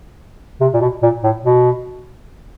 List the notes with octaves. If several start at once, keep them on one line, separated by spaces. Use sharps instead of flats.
C3
A#2
B2
A#2
A2
B2